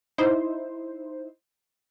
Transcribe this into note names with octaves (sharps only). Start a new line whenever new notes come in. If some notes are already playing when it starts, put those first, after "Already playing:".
D#4 E4 C5